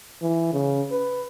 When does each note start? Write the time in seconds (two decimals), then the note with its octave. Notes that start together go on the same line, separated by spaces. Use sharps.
0.22 E3
0.53 C#3
0.91 B4